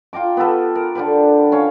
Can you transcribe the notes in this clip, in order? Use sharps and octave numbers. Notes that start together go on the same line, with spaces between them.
F4 G5 A#5 D6
B3 G4 A4 B4
A#4
D3 D4 G4 B4
C#4 C#5 F5